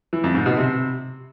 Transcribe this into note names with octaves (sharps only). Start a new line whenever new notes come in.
E3
F2
G#2
B2
C3